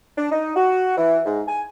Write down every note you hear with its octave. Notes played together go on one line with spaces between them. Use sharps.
D4
D#4
F#4
E3
G#2
G#5